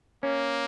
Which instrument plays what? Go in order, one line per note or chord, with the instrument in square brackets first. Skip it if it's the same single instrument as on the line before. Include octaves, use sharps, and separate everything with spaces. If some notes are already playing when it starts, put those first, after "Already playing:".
[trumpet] A#3 [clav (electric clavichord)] C#4